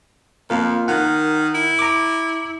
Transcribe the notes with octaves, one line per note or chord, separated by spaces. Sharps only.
F2 A#3 F4 A#4
D#3 A#4 F#5
E4
A#5 D6